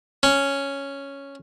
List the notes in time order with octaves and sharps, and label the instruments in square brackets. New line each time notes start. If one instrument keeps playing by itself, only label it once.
[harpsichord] C#4